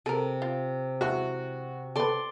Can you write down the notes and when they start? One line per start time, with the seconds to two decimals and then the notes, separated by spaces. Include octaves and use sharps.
0.06 C3 A4 A#4
0.42 F4
1.01 E3 G#3 F#4
1.96 A4 B4 D5 C6